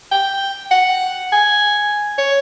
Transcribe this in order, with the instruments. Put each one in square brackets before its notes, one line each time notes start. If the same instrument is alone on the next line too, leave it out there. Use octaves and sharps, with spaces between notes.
[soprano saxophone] G5
F#5
G#5
C#5